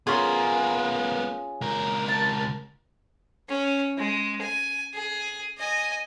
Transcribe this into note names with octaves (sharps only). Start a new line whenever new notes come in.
B3 C#4 F4 G#4 A#4
C#2 A#4
A5
C#4
G#3
G#5
G#4
D#5 G#5